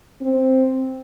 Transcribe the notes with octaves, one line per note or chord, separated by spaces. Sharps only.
C4